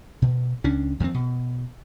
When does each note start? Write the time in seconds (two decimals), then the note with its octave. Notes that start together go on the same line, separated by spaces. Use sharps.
0.22 B2
0.64 C#2 C#4 D4
1.00 F2 D#3 G#3 C4
1.14 B2